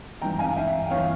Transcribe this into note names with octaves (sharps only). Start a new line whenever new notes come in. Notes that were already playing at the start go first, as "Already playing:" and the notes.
G#1 G2 E3 G5 A#5
F5 G#5
E5 G5
G5
G1 E3 C#5 F5